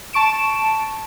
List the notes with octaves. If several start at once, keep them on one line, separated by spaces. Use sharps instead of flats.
A5 C#6 D7 E7